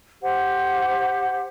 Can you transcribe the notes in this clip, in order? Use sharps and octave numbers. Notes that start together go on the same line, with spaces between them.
G4 C5 F#5